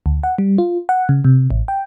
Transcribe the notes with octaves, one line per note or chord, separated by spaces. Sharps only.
D2
F#5
G3
F4
F#5
C#3
C3
A1
G5